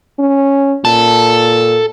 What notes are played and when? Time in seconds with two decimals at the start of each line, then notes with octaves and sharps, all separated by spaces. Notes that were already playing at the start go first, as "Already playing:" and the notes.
0.19 C#4
0.85 A#2 A4